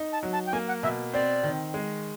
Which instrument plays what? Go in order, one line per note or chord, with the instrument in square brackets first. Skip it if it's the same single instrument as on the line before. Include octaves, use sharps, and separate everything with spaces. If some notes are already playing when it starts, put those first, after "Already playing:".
Already playing: [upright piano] D#4
[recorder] A5
[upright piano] F#3
[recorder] A5
G5
[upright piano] A#3 [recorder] G#5
[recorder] F#5
[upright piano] B2 [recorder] E5
[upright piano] C4 [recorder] D5
[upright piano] D#3
G#3